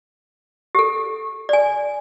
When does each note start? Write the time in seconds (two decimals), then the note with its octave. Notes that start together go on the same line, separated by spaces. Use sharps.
0.75 G4 A4
1.49 D5 G#5